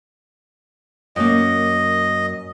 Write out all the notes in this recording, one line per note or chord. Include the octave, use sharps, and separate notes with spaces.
F#2 A#3 D#5